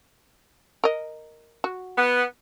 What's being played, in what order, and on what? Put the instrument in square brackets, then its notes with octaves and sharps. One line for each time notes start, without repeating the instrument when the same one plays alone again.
[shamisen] A#4 D#5
F#4
[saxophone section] B3